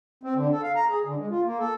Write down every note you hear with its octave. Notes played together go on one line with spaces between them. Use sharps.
C4
D3
A4
F5
A#5
G#4
D3
G#3
F4
A#3
A4